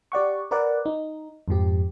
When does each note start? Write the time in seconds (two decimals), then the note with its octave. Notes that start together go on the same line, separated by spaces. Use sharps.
0.12 G4 D5 F#5 C#6
0.51 A#4 B4 D5 F#5
0.86 D#4
1.48 F2 G#2 F3 G4